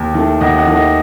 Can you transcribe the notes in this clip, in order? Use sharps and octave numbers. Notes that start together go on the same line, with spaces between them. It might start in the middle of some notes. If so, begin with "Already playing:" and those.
Already playing: D#2
D#3 A3
D#2 D#5 F#5
D#5 F#5
D#3 A3
D#5 F#5